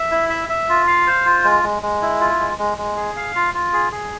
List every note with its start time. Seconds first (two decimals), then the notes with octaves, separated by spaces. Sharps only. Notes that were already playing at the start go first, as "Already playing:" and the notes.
Already playing: E5
0.12 E4
0.30 E5
0.49 E5
0.69 F4
0.87 F5
1.07 C5
1.25 F4
1.44 G#3
1.63 G#3
1.82 G#3
2.02 E4
2.20 F4
2.39 G#3
2.59 G#3
2.78 G#3
2.97 G#4
3.16 F5
3.35 F4
3.54 F4
3.73 G#4
3.92 G#4